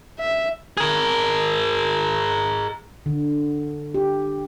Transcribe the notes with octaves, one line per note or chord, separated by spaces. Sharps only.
E5
G#4 A#4
D3
G4